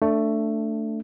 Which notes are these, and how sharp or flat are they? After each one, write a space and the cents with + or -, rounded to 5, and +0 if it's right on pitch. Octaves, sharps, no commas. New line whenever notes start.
A3 +10 D4 +0